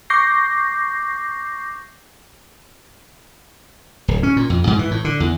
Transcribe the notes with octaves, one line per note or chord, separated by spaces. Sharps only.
C#6 D6 G6 A#6 C7
D1
C#4
A#2
F2
G#2
E3
A2
D3
E2